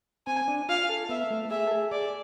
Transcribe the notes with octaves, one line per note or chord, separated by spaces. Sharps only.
C4 G#5
D4
F4 F5
A4
B3 E5
A3
G#4 E5
A4
G#4
G#4 D5